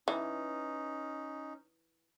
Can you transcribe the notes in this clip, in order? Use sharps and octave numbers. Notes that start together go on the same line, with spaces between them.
E3 C#4 D#4